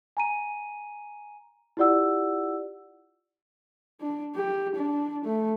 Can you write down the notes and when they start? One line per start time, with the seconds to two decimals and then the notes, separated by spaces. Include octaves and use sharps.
0.17 G#5 A#5 D#7
1.77 E4 F4 G4 D5 F#5 E6
4.01 D4
4.35 G4
4.76 D4
5.25 A3